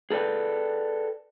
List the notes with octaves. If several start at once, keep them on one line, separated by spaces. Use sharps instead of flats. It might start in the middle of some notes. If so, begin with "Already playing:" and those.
G#4 A4 B4 D5 G5